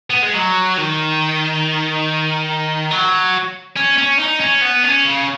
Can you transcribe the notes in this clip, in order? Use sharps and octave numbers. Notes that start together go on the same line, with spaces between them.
B3
G#3
F#3
D#3
F#3
C#4
C#4
D#4
C#4
B3
C#4
C#3